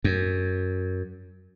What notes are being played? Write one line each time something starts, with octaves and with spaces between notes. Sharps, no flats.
F#2